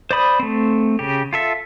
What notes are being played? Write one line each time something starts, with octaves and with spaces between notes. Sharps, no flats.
C5 D5 B5 D#6
A3 C4
C#3 G4
F4 A4 E5